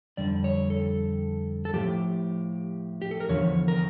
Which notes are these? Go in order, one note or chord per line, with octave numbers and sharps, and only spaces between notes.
F2 D3 G3 D5
C#5
A4
A4
A2 F3 G4
G4
A4
A#4
E2 D3 F3 C#5
A#4